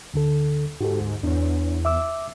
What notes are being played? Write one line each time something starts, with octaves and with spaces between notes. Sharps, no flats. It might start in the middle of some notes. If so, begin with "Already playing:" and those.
D2 D3 A4
G#2 F#4 G4 A4
D2
E2 D4 C#5
E5 D6 E6